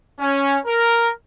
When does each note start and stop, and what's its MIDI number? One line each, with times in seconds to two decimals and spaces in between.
0.20 0.59 61
0.66 1.11 70